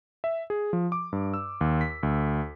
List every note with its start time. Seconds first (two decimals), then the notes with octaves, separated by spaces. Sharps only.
0.24 E5
0.50 G#4
0.73 F3
0.92 D6
1.13 G2
1.34 E6
1.61 D#2
1.81 B6
2.03 D2